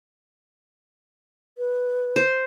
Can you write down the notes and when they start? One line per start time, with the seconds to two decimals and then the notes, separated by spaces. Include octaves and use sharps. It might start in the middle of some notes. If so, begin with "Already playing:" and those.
1.58 B4
2.16 C5